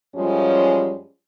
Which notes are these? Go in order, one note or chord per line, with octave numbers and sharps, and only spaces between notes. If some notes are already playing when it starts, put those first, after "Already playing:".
F#2 F3 G3 G#3 C#4